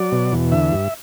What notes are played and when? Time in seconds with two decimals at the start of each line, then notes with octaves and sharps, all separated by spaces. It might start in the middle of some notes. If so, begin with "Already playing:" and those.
Already playing: F#3 D5
0.12 B2
0.32 E2
0.52 D3 E5
0.72 G2